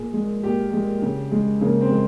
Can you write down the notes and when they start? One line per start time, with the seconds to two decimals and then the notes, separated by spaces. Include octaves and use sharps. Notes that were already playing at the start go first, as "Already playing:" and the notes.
Already playing: A#2 G#4
0.13 G#3
0.43 A#2 G4
0.73 G#3
1.02 C#3
1.32 G#3
1.61 C#3 A#3
1.81 C4
1.91 G#3